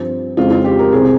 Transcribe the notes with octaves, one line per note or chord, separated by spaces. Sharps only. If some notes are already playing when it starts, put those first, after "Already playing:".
Already playing: G2 F3 C4
F2 C#3 G#3 C4 F4
F4
G4
A#4
C2 C3 G3 C4 G#4